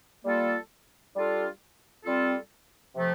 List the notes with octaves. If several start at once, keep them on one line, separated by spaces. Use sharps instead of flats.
G3 A#3 F4 A4
G3 D4 F4 A4
G3 C4 F4 A4
C3 F3 A3